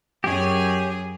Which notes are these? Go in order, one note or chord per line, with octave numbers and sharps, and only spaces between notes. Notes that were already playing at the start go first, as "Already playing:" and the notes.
F#2 G4 G#4 C#5